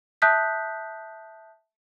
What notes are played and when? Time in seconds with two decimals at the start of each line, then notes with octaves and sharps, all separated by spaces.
0.22 E5 A5 D#6 F#6 G6 B6